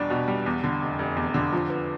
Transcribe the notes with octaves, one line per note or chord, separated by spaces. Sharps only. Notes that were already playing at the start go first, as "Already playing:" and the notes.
Already playing: E2 B2 G3 D4
B2
G3
E2
D3
F1
F1
E2
D3
F3
B3